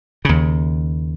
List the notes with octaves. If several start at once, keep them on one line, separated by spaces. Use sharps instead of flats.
D#2 C#3